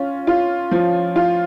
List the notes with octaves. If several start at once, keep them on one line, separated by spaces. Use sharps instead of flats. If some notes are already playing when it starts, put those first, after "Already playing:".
Already playing: C#4 F4
F4
F3
F4